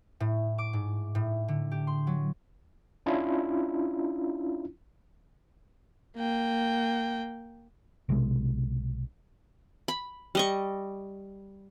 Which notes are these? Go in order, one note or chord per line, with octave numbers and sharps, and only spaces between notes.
A2
D6
G#2
A2
D3
G4
C6
F#3
C#4 D4 E4 F4
A#3 G5
B1 C3 G#3
B5
G3 D#5 C#6